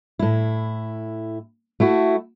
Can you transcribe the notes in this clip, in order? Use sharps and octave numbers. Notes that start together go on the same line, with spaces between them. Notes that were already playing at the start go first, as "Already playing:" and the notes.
A2 E4
A3 E4 F#4